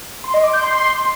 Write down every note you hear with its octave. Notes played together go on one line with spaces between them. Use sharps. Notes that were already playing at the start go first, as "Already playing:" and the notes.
C6
D#5
D6
G6
C6